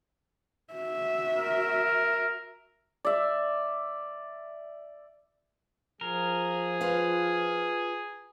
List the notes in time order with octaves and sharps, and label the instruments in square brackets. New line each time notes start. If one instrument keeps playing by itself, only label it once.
[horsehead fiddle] F#4 E5
[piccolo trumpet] A#4
[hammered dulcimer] D5 E5
[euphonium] F3 [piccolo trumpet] G#4 [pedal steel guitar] A#4
[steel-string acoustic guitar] F4 B4 F5